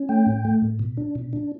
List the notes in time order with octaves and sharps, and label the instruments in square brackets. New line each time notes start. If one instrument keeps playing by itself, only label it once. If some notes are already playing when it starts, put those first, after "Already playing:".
Already playing: [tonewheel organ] C#4
A3 G5
A2
A3
A2
B2
D4
B2
D4